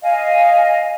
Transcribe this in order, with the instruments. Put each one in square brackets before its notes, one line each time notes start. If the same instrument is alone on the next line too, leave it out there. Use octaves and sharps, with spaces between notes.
[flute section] D#5 F5 G#5